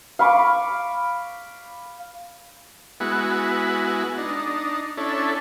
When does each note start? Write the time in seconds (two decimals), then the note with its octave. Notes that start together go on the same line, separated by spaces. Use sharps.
0.19 F5 B5 C#6 D6
3.00 G#3 B3 E4 F#4
4.18 D4 D#4
4.97 C#4 D4 E4 A4